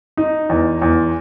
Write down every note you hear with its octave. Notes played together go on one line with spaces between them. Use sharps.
D#4
E2
E2